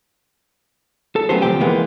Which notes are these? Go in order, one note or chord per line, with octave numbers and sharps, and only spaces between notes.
A4
F#3 A3 B3 C#4 G4 C5
D2 C3 F3 G4 G5
E3 G#3 A#3 B3